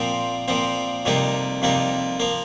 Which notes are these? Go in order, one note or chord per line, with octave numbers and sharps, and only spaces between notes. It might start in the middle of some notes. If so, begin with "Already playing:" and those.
Already playing: A#2 F3 C4
A#2 F3 C4
F2 C3 G3 A#3 D#4
F2 C3 G3 A#3 D#4
F3 A#3